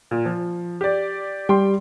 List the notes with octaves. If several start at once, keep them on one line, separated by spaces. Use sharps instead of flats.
A#2
F3
G4 D5
G3 G5 C6